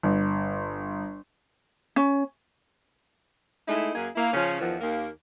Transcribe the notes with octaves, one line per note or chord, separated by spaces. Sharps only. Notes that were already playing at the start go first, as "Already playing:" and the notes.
G1
C#4
G#3 A3 D#4 E4
F#2 A#3 G#4
A#3 E4
C#3 F3 C#4
E2 D#3 F3
D#2 A#3